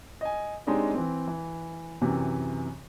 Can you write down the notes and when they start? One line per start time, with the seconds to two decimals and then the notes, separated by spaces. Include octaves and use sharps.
0.21 D#5 G#5
0.67 G#3 C4 D4 D#4 G4 C#5
0.94 E3 C4
1.27 E3
2.01 F#2 C3 E3